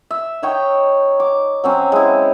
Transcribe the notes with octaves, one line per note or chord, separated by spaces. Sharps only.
E5
D#4 C#5 G5
D6
F#3 C4 C#4
G#3 E4